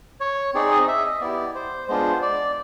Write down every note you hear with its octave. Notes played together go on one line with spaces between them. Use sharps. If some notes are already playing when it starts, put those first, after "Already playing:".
C#5
C4 D#4 G#4 D5
D#5
E5
D#5
B3 E4 G4 D5
C5
G#3 B3 D4 F4 C5
D5